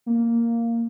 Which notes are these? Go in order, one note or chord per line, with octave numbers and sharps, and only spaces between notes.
A#3